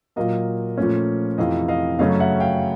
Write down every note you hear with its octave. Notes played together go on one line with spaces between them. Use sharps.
A#2 F#3 A#3 D#5 F5
A#2 F3 A3 C#4
F2 C3 E3 D#5 F5
D#5 F5
F#2 C#3 F#3 A3 C#4 D#5 F5
E5 F#5
F5 G5